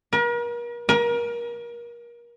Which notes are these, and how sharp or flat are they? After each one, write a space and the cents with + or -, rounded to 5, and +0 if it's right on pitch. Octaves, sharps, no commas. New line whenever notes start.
A#4 +40
A#4 +30